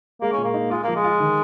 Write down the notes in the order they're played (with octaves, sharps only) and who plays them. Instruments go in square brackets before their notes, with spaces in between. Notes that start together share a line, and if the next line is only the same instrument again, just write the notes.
[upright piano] G#3 [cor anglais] A#3
[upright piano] A#2 [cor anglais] C#4
[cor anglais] A#3
[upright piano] D#4
[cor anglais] G#3 [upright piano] F4
[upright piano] F3 [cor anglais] A#3
[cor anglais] G#3
[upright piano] F4
D#3